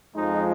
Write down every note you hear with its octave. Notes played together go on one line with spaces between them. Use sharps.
F2 F3 G#3 D#4